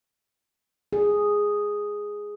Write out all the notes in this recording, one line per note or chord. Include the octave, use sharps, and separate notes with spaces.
G#4